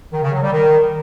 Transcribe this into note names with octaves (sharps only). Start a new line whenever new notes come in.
D#3
C#3
F#3
G3
D#3